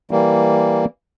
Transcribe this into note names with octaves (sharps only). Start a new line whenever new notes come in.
E3 G3 A#3